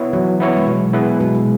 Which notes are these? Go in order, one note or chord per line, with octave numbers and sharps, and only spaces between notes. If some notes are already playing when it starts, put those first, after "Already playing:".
Already playing: B3 E4 C#5
E3 F#3
B3 E4 C#5
G#3
B2 F#3
B3 E4 G#4 B4
B2 G#3
G#3